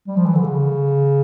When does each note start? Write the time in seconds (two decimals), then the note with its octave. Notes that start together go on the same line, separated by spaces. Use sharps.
0.07 G3
0.16 F3
0.25 E3
0.35 D3
0.44 C#3